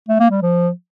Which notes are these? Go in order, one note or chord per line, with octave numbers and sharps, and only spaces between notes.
A3
A#3
G3
F3